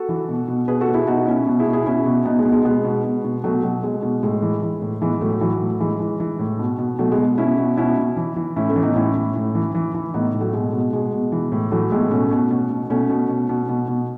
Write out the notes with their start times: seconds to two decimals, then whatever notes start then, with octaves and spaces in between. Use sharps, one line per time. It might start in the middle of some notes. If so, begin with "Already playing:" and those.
Already playing: F#4 A4
0.09 E3
0.29 B2
0.48 B2
0.68 B2 G#4 B4
0.81 F#4 A4
0.88 B2
0.94 E4 G#4
1.07 B2 D#4 F#4
1.27 B2 C#4 E4
1.47 B2
1.59 E4 G#4
1.66 B2
1.73 E4 G#4
1.86 B2 C#4 E4
2.06 B2
2.25 B2 B3 D#4
2.39 G#3 B3
2.45 B2
2.52 G#3 B3
2.65 B2 G#3 B3
2.85 B2
3.04 B2
3.24 B2
3.44 B2 F#3 A3
3.63 B2 F#3
3.83 B2 G#3
4.03 B2
4.23 A2 G#3
4.42 E3
4.62 E3
4.82 A2
5.01 E3 G#3 B3
5.21 A2 F#3 A3
5.41 E3 F#3
5.61 A2
5.80 E3 G#3
6.00 E3
6.20 E3
6.39 A2
6.59 B2
6.79 B2
6.99 B2 F#3 A3
7.11 G#3 B3
7.18 B2
7.38 B2 C#4 E4
7.58 B2
7.77 B2 C#4 E4
7.97 B2
8.17 E3
8.36 E3
8.56 A2 C#4 E4
8.69 A3 C#4
8.76 E3
8.83 B3 D#4
8.96 A2 C#4 E4
9.16 A2
9.35 A2
9.55 E3
9.75 E3
9.94 E3
10.14 A2 B3 D#4
10.34 A2
10.40 F#3 A3
10.53 B2 G#3
10.73 B2
10.93 B2 G#3
11.13 B2
11.32 E3
11.52 A2
11.72 E3 F#3 A3
11.91 A2 G#3 B3
12.11 B2 A3 C#4
12.31 B2
12.51 B2
12.70 B2
12.90 B2 A3 C#4
13.10 B2
13.29 B2
13.49 B2
13.69 B2
13.88 B2